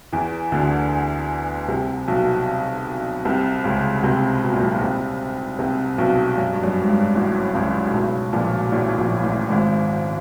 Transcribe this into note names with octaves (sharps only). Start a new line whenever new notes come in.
E2 E3
D2 D3
C2 C3
B1 B2
C2 C3
C#2 C#3
C2 C3
B2
A#2
B1 B2
C2 C3
C2 C3
B1 B2
F#2
G2
F#2
G#2
G2
A1 A2
C#2 C#3
B1 B2
A#1 A#2
A1 A2
A#1 A#2
A1 A2
G#1 G#2